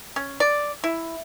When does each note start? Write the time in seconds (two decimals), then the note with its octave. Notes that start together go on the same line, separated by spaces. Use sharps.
0.16 C#4
0.40 D5
0.84 E4